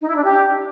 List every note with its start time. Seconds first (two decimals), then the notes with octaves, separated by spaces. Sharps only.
0.02 D#4
0.09 E4
0.16 D4
0.23 G4